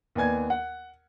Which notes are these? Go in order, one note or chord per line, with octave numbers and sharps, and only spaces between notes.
D#2 B3 D5 G#5 G#6
F#5